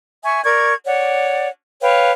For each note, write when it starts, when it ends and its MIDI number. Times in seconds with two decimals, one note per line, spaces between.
0.23 0.41 76
0.23 0.41 80
0.23 0.41 85
0.44 0.73 70
0.44 0.73 74
0.44 0.73 85
0.44 0.73 92
0.84 1.48 73
0.84 1.48 74
0.84 1.48 78
1.81 2.11 71
1.81 2.11 73
1.81 2.11 77
1.81 2.11 79